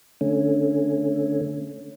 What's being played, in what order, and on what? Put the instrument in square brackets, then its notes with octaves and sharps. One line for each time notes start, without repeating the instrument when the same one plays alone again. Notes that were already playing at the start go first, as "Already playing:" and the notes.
[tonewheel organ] D3 A3 C#4